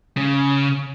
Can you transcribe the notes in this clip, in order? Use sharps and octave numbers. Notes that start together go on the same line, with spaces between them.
C#3